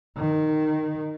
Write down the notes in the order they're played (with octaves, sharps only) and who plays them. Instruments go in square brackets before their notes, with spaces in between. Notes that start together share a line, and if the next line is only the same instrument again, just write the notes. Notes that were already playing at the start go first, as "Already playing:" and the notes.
[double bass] D#3